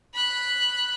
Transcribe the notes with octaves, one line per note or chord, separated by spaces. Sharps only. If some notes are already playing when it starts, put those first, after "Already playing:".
B5 F#6